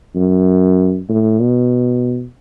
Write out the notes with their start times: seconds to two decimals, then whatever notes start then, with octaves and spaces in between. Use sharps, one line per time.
0.16 F#2
1.09 A2
1.40 B2